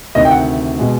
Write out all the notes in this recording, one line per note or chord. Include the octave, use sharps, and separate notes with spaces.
D2 C3 D#3 D#5
G5
F#5
B2 G#3